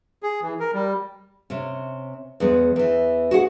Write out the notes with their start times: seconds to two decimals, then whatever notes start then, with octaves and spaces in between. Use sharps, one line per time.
0.23 G#4
0.42 E3
0.60 A#4
0.73 G3
1.50 C3 C#4
2.40 E2 G#3 B3
2.76 E2 E3
3.31 F#4 G#4 F#5